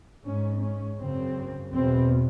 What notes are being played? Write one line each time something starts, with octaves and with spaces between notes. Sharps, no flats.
G#2 C#4
C#4
F#2 C#3 C4
E2 B2 C4